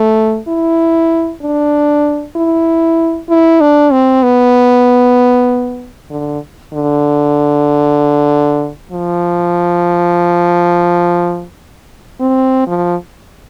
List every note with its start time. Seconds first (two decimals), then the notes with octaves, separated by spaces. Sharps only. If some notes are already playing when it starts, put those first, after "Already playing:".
Already playing: A3
0.48 E4
1.42 D4
2.36 E4
3.29 E4
3.61 D4
3.92 C4
4.23 B3
6.10 D3
6.73 D3
8.92 F3
12.20 C4
12.67 F3